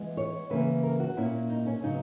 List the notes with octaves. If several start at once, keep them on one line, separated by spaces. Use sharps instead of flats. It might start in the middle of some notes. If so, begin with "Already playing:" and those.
Already playing: E3 G#3 B3
C#5
C#3 E3 A#3 C#4 B4
A#4
F#4
A#2 A#3 C#4 E4
D#4
C#4
C#3 F#3 B3 D#4